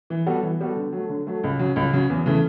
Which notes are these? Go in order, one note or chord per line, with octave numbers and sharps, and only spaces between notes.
E3
G3 B3 F#4 A4
E3
G3 B3 F#4 A4
D3
F#3 A3
D3
F#3 A3
C#2
C#3 F#3
C#2
C#3 F#3
E2
C#3 E3 A3